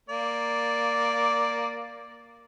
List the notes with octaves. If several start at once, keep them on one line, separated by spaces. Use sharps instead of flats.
A#3 D5